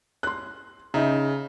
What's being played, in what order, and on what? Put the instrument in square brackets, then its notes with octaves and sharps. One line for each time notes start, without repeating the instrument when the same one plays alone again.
[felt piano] C6 F#6
[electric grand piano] C#3 [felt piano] D#4 E5 A#5